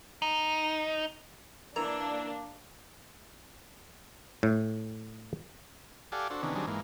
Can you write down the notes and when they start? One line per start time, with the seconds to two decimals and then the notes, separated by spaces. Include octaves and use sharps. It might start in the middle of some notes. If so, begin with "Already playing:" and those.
0.22 D#4
1.76 E3 A#3 D4 A#4
4.43 A2
6.12 G4 A4 D5 F5 F#5 G#5
6.30 D4 F#4 A4 C5
6.43 C3 D#3 E3 B3 C#4 D4
6.55 D#3 F#3 G3 C4 D4 G#4
6.67 G#2 E3 A#3